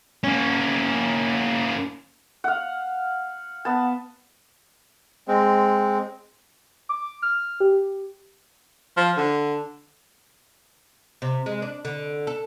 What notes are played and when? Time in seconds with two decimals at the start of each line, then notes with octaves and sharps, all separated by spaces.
0.24 A#3 C#4
2.44 F5 F#5
3.65 B3 A5
5.28 G#3 C4
6.89 D6
7.22 F6
7.60 G4
8.97 F3
9.17 D3
11.22 C3
11.46 G#3
11.62 D4
11.85 D3
12.27 A4